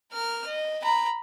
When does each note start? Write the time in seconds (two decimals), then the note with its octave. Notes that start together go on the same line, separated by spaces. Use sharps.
0.13 A#4 F6
0.47 D#5
0.83 A#5 B5